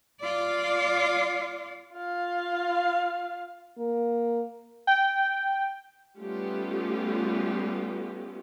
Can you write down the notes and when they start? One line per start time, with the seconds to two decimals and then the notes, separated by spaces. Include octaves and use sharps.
0.21 F4 D5
1.94 F4 F5
3.78 A#3
4.87 G5
6.19 G3 A3 B3 C#4 F4 G4